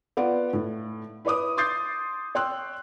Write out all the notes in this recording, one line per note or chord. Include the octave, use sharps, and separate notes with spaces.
B3 F4 D5 F#5
A2
E4 B4 C#5 D6 D#6
C6 D6 D#6 G6 A6 C7
C#5 G5 C6 E6 F#6